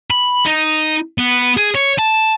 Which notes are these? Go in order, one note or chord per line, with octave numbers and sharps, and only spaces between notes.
B5
D#4
B3
G#4
C#5
A5